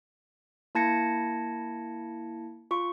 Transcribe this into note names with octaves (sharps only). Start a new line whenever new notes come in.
A#3 E4 A5 G#6 A#6 C#7
F4 C#6